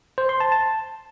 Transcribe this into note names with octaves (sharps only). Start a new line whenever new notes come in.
C5
C6
A5
A5